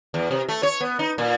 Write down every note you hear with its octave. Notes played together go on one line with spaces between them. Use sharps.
E2
C3
A3
C#5
B3
D#4
A#2